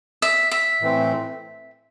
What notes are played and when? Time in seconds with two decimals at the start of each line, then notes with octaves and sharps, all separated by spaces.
0.22 E5
0.51 E5
0.81 A2 E3 A3 C4